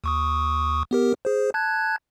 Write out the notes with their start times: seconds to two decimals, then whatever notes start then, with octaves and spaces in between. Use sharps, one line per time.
0.04 D#2 C#6 D#6
0.91 B3 G4 A#4
1.25 G#4 C5
1.54 A5 F#6 G#6